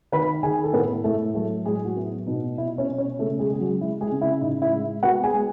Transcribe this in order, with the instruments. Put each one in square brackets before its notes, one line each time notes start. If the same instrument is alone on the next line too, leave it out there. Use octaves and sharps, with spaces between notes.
[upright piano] D#3 B4 B5
D#3 G#4 G#5
A4
A2 B3 B4
A2 A3 A4
F#3 A3 A4
A2 G#3 G#4
F#4
B3 E4
B2 D#4
B2 E4
C#4 C#5
B2
C#4 C#5
C#3 A3 A4
G#3 G#4
G#3 G#4
F#3 F#4
G#3 E4
G#3 G#4
C#3
E4
A2 D#4
E4
G#3
B3 F#4 F#5
G#4 G#5
G#3